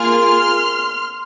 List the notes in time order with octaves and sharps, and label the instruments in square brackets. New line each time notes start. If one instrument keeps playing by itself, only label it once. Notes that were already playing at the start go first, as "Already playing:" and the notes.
Already playing: [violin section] A#3 F4 G#4 C6 F6